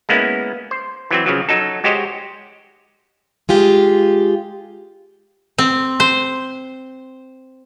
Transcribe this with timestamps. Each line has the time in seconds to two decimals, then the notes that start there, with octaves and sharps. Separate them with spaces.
0.09 G#3 A#3 B3 C#4 E4
0.71 C5
1.11 E3 F#3 C4
1.26 C#3 F3 F#3
1.49 F#3 D#4 A4
1.84 G#3 F#4 G4 C5 C#5 D#5
3.49 G#3 F4 G4 G#4
5.58 C4
6.00 C5